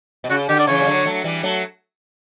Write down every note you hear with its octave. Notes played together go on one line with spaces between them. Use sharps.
B2
C#3 F#4
D3 G4
D5
C#3 E3 C#5
G3
D3 F#3
F#3 A3
E3 G3
F#3 A3